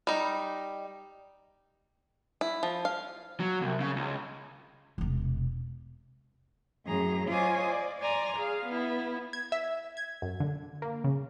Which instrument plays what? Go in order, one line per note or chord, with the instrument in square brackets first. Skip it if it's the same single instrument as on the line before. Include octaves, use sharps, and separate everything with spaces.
[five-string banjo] G3 D#4
E4
F3
F5
[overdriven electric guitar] F#3
C2
C#3
C#2
[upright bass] E1 C3
[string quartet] F#2 A2 G#4 A#5
F4 C5 C#5 D#5 G#5 D6
D5
D5 G#5 A#5 C6
G#4 F5
B3 E4
[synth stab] G#6
E5
G#6
F#2
D3
A#3
C#3